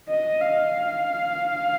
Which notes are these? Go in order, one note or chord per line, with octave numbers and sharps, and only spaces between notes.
D#5
F5